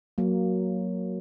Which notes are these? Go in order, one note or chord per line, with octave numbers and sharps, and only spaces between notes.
F#3 A#3